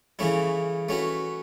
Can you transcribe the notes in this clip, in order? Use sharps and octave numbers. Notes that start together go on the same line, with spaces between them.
C#3 E3 A3 C#4 E4
A3 C#4 F#4 B4